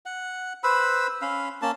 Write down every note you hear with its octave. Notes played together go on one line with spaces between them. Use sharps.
F#5
B4 C5 B5 E6
C#4 F5 B5
A#3 C#4 A5